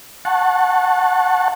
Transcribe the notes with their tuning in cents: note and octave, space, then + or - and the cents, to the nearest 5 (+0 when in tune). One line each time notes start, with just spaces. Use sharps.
F#5 +0 A5 +0 C#6 -25